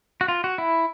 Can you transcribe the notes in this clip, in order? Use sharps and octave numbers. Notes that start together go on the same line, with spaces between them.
F#4
F4
F#4
E4